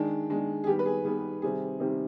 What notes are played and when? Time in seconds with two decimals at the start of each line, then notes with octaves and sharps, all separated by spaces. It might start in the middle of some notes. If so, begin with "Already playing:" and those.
Already playing: D#3 G#3 D4
0.30 D#3 G#3 D4
0.64 G#4
0.67 D#3 G3 B3 G4
0.79 B4
0.86 G#4
1.05 D#3 G3 B3 G#4
1.42 C3 D#3 G3 C4 G#4
1.80 C3 D#3 G3 C4